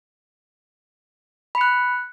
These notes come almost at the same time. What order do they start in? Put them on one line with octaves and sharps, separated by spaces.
B5 C#7 F#6